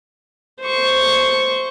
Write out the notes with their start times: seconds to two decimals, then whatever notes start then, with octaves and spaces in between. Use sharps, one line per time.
0.60 C5 C#6